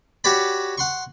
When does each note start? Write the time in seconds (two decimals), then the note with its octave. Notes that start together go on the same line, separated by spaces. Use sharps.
0.24 F#4 G4 C#5 D5 B5
0.78 F#5 C6 C#6